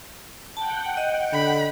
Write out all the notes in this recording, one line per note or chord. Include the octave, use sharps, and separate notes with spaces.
F#5 G5 A5
D#5
D3 B5